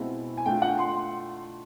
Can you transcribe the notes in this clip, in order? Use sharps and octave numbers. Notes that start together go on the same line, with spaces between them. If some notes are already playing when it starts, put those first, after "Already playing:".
Already playing: B2 G#3 C4 E4
G#5
A3 D4 F4 G5
F#5
C6